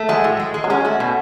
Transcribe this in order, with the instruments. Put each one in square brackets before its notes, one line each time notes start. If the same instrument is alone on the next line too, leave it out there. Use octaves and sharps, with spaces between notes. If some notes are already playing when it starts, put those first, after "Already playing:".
Already playing: [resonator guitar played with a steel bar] A3
[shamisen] F#3 [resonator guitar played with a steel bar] G#3
[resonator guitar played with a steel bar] A2
G#3
G#3
[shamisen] F#3
[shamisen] G#3 [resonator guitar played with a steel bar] C#4
[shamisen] A3 [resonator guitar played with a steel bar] F#4
[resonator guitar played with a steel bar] B2